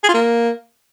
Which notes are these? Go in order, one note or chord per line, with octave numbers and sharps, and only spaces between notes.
G#4
F4
A#3